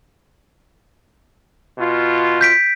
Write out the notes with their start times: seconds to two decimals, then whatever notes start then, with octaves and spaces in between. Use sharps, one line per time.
1.78 B2 F4
2.41 G6 B6 D7